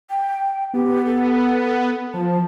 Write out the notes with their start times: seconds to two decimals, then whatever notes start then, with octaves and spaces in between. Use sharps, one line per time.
0.10 G5
0.74 B3 G4
1.06 A4
2.14 F3 A5